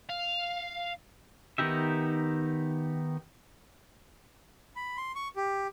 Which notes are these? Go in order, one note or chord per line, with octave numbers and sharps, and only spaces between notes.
F5
D#3 B3 D#4 G4 E5
B5
C6
C#6
G4